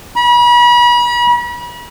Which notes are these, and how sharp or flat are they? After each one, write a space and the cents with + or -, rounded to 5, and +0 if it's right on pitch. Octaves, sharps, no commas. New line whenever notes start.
B5 -40